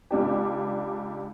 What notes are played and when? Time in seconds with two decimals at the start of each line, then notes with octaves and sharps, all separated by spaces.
0.11 C#2 D4 G4